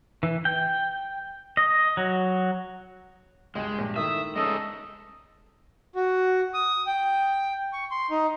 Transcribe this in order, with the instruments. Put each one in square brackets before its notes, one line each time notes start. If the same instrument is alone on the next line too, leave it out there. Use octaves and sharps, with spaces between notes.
[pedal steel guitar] E3
G5
D#5
F#3
[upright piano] C#2 G2 E7 [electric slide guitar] G#3
[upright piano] A#1 G2
[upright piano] D#3 A3 E4 [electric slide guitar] E5 [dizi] D#6
[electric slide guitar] G#3 C#4 D#4 [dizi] A4 [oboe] D#5
[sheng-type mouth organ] F#4
D#6
G5
C#6
C6
D#4